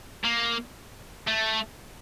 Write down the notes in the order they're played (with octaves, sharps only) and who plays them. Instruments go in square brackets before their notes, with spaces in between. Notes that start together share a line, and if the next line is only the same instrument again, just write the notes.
[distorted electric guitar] A#3
A3